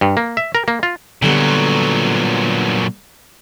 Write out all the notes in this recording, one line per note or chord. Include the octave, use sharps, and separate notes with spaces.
G2
A#3
E5
A#4
A#3
F4
A#2 D3 F#3 G3 B3